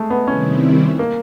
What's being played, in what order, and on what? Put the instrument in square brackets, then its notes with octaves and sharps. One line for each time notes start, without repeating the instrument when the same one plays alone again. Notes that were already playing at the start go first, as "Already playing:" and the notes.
Already playing: [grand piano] G#3 A3
B3
[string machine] C3 D#3 G3 C4 E4 [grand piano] C#4
[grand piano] A#3